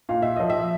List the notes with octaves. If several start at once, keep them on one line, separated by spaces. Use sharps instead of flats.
A#2 F5
E5
F3 D#5
E5